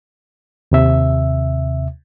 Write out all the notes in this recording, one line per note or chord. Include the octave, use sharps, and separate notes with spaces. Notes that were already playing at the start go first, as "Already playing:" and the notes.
D#2 C3 E5